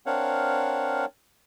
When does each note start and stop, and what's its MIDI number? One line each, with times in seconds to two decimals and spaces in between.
0.06 1.05 60
0.06 1.05 62
0.06 1.05 70
0.06 1.05 73
0.06 1.05 77
0.06 1.05 78